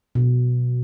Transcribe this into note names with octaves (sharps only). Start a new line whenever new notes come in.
B2